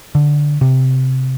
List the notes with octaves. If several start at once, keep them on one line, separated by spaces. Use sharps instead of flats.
D3
C3